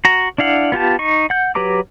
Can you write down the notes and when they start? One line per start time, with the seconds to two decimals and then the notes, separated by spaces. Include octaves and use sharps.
0.05 F#4 A#5
0.38 D4 E4 F5 F#5
0.72 B3 F4 G4 A5
0.99 D#4 C#6
1.30 F#5 G6
1.55 F#3 G4 B4 A#5 D6